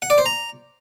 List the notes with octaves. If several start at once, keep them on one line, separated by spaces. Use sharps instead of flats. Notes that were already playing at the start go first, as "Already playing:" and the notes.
F#5
D5
C5
A#5